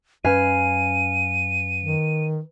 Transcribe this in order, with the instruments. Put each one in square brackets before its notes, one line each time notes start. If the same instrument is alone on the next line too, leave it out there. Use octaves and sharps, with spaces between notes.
[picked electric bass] F#2 C#4 [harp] B4 F5 G#5 [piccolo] D#7
[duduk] D#3